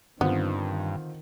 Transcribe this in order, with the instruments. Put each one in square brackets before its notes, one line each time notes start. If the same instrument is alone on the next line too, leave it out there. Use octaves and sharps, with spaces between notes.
[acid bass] G2 [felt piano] D3 C4 F4 [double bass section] D#3 [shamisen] B3